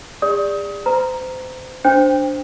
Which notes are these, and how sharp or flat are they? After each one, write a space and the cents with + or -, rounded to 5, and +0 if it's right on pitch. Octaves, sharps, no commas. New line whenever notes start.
G#4 -45 D5 +0 D#6 +30
C5 -35 A#5 +0
D4 +0 C5 +0 G5 +35